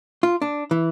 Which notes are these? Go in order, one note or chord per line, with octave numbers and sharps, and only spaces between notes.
F4
D4
E3